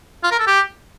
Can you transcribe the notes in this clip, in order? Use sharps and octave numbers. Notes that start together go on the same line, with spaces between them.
F4
A#4
A4
G4